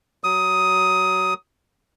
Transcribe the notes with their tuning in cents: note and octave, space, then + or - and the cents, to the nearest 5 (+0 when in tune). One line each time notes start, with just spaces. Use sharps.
F#3 +15 D#6 +10